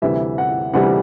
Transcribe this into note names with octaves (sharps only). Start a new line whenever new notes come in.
D2 C3 E3 G3 E5
F#5
D2 C3 E3 G3 F#5